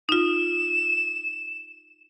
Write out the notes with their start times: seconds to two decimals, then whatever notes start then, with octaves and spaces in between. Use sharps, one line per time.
0.09 D#4 F4 E7